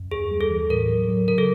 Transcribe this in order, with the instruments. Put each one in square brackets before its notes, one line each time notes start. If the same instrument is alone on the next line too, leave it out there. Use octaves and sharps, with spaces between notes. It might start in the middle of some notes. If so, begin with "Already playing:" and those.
Already playing: [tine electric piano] F#2
[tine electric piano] D#2 [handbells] G#4
[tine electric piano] G3
[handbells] A4
[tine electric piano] E3
[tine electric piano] A2 [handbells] A#4
[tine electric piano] F#3
F#3
[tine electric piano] C#3 [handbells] A#4
[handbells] A4